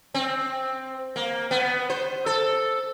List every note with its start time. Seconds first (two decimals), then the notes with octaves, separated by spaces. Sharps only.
0.14 C4
1.16 A#3
1.51 B3
1.90 C5
2.26 A4